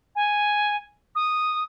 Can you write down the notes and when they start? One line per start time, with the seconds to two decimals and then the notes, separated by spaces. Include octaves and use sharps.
0.16 G#5
1.15 D#6